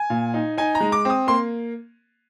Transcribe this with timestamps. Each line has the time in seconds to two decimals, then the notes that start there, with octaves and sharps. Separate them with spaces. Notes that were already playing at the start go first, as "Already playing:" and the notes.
Already playing: G#5
0.10 A#2
0.34 D#4
0.58 D#4 G#5
0.75 A#5
0.80 G#3
0.92 D6
1.05 C4 D#6
1.27 A#3 C6